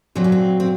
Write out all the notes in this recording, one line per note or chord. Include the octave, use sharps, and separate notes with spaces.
A#2 F#3 C4
C#4
C4
C4